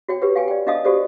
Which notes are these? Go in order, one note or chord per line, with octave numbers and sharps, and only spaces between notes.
F#4 C#5 G5
G4 B4 C#5
F5 G5 G#5
D5 G5
D4 D#5 F5 A5 D#6
F#4 G4 A4 C5 D5